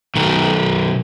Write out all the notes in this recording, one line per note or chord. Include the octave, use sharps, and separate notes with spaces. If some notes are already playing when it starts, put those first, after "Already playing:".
B1 D#3